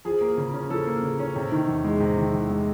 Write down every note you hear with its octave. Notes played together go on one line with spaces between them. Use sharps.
F3 G#4
A#3
C#3
C#4
F3 A4
A#3
C#3
C#4
C3
D#3
E2
G#3
C3
D#3
E2
G#3